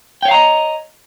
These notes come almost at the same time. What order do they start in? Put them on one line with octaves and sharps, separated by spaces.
G5 C#5 F5 A#5 D#5